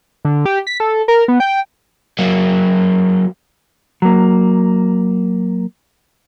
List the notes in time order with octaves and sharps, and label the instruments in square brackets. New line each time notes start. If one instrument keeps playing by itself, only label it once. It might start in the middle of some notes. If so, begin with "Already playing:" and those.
[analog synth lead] D3
G4
B6
A4
A#4
B3
G5
[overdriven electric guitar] F#3 A#3
[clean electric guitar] F#3 A#3